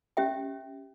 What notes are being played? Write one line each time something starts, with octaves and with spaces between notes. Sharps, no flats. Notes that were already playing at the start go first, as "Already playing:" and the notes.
C#4 G4 E5 G5